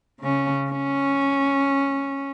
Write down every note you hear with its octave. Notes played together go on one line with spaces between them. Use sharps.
C#3 C#4
C#4